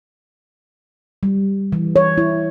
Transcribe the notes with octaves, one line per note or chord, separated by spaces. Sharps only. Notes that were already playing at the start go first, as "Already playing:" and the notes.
G3
E3
C#5
E4